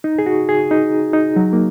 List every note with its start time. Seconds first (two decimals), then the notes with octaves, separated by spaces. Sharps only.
0.04 D#4
0.19 G#4
0.26 F#4
0.49 G#4
0.71 D#4
1.13 D#4
1.36 F#3
1.53 A#3